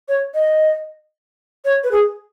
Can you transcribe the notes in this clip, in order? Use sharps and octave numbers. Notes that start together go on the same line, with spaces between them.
C#5
D#5
C#5
B4
G#4